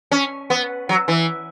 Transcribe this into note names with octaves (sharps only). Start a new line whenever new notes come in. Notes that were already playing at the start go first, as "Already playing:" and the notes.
C#4
B3
F#3
E3